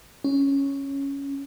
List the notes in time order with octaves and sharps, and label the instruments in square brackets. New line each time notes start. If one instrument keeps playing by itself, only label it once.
[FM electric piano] C#4